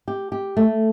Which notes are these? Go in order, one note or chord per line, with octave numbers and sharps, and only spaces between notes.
G4
G4
A3